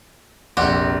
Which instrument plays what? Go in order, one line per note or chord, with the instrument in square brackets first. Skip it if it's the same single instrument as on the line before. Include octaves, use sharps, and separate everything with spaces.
[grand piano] F1 A#1 C6 [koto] F#4 G4